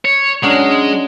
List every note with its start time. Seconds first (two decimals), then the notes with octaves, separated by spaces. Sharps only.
0.05 C#5
0.43 F#3 G#3 C#4 D4